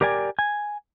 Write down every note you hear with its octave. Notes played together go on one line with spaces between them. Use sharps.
G4 A#4 D5 G5 G#5
G#5